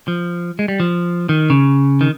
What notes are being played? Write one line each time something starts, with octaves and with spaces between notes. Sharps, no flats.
F3
G#3
G3
F3
D#3
C#3
D#3